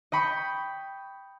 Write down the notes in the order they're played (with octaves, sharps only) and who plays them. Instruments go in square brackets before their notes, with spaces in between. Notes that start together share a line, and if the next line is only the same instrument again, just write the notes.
[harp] D#5 G5 B5 C#6